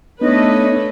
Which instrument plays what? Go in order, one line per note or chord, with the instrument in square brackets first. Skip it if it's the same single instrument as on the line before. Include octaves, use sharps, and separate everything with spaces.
[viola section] A3 A4 B4 [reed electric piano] B3 D#4 [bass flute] D4 [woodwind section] C#5 D#5